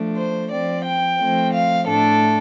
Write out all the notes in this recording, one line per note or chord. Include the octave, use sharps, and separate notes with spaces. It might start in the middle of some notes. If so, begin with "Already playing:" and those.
Already playing: F3 A3 D4
C5
F3 C4 D5
G5
F3 A3 C4
F5
A2 A3 D4 A4